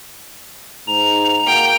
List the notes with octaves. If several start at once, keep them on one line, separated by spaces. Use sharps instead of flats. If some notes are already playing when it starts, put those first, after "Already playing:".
G#2 A#5 F7
A#3 F#4 G5